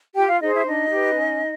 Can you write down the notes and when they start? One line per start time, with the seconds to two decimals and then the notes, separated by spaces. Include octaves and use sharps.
0.16 F4 G4 G5
0.28 F4 F5
0.41 D#4 G#4 C5 D#5
0.53 E4 E5
0.66 D4 D#4 D#5
0.91 G4 B4
1.17 C#4